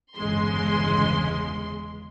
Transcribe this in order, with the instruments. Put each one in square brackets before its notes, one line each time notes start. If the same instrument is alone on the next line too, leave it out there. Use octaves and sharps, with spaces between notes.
[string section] G1 E2 C#3 G#3 C6